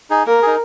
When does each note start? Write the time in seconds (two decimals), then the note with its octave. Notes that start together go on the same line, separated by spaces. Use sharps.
0.10 D#4 G#4
0.26 A#3 A#4
0.42 D#4 G#4